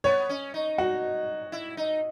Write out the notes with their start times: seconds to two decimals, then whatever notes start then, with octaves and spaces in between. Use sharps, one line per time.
0.04 B3 C#5
0.29 C#4
0.54 D#4
0.78 F#4
1.52 E4
1.77 D#4